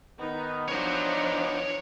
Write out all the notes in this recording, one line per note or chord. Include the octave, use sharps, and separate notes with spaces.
D#3 B3 D#4
E2 F3 B3 D4 D#4 C#5 A#5